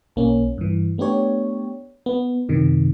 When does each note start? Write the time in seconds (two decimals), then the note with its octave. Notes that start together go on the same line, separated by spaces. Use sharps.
0.16 B1 A#3 C#4
0.58 G2 E3
0.98 A3 B3 D4 G4 C#5
2.06 B3
2.49 F#2 C3 D#3